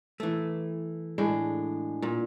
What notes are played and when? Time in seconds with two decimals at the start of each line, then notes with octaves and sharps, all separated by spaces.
0.20 E3 A3
1.18 A2 G#3 D4
2.02 A#2